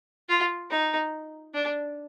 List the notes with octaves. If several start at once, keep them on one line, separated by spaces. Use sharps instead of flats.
F4
D#4
D4